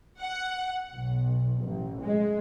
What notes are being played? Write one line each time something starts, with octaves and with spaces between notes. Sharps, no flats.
F#5
B1
A1
G#3